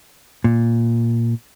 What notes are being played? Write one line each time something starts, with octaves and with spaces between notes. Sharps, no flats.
A#2